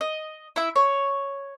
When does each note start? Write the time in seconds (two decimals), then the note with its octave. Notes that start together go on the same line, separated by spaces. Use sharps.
0.01 D#5
0.56 E4 E5
0.76 C#5